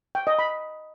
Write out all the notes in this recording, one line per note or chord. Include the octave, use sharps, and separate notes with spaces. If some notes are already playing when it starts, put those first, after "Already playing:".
G5
D#5
B5